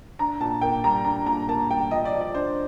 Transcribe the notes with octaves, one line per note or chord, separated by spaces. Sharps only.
D4 A#5
A#2 A5
A#3 G5
G3 A#5
D4 A#5
A#2 A#5
A#3 A5
G3 G5
F3 D#5
D5
F3
D5
D4 C5